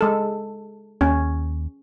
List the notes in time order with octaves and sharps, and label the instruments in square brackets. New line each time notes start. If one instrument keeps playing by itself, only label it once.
[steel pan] G#3 A4
[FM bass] D#2 [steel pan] C#4